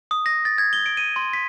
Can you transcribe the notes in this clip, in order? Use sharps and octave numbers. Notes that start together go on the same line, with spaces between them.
D#6
A#6
A6
G#6
G7
D7
D#7
C6
B6